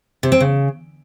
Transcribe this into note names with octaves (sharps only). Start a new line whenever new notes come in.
C3
C4
C#3